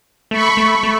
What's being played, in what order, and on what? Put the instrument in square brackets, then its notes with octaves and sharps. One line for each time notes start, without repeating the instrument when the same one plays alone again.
[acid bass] A3 [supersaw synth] B5 C#6
[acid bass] A3
A3